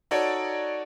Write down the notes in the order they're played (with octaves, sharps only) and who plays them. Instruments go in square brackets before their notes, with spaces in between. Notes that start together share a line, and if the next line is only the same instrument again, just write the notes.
[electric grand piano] D#4 F#4 A4 C#5 D5